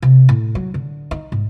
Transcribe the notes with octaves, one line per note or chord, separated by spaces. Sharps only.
C3
A2
F#3
D3
D#4
G#2